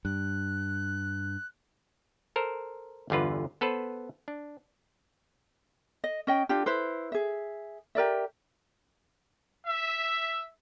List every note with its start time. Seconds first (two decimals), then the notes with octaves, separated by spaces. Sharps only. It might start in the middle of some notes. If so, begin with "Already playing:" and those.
0.05 G2 F#6
2.36 A4 A#4 C5
3.10 G1 E2 D3 F4 B4
3.61 B3 A4 B4 C5
4.28 D4
6.04 D#5
6.27 C#4 D#5 G5
6.49 D4 F4 G4
6.66 E4 B4 C5
7.12 G#4 E5
7.95 G4 A#4 D5 E5
9.66 E5